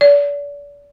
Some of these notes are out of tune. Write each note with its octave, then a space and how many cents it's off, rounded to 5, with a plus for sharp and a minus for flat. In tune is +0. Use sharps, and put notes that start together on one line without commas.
D5 -35